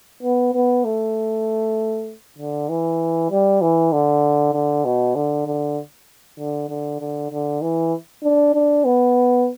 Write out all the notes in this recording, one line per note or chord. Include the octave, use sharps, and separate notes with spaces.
B3
B3
A3
D3
E3
G3
E3
D3
D3
B2
D3
D3
D3
D3
D3
D3
E3
D4
D4
B3